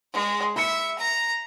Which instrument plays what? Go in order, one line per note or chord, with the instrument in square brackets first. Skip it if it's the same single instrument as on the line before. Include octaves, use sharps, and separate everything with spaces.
[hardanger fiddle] G#3
[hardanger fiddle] E5 [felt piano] B5 C#7
[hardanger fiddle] A#5